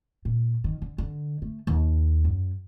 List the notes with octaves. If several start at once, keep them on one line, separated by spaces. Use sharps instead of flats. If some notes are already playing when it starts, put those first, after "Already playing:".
A#2
D#3
D3
D3
A3
D#2
F#2